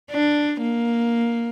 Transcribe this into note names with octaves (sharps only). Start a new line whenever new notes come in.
D4
A#3